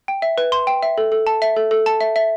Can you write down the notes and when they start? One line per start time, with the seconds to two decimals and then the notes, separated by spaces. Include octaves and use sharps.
0.08 G5
0.22 E5
0.38 B4
0.52 C6
0.67 G5
0.83 E5
0.98 A4
1.12 A4
1.27 A5
1.42 E5
1.56 A4
1.71 A4
1.86 A5
2.01 E5
2.16 E5